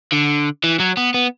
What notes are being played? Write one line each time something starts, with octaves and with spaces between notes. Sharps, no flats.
D3
E3
F#3
B3
B3